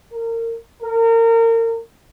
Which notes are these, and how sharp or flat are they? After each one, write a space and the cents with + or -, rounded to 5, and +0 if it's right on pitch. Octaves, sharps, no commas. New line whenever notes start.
A#4 -25
A#4 -30